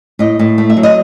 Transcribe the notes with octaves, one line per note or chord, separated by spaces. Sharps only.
A2 D#5
A2
A3
E5
F#3
D#5